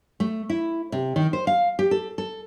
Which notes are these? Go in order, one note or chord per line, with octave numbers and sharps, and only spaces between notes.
A3
E4
C3
D#3
C5
F5
G4
A4
A4